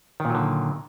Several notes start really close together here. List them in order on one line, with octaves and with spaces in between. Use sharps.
D#3 A#2 F#3 D3